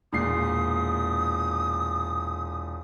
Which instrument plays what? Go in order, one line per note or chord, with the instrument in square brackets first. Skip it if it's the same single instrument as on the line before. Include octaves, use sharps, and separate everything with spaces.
[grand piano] E1 A#2 C7 [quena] D#6